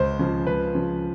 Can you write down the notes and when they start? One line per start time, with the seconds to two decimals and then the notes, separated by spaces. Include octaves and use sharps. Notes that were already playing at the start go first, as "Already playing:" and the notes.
Already playing: C#2 C5
0.19 C#3 F3
0.47 C#2 B4
0.75 C#3 F3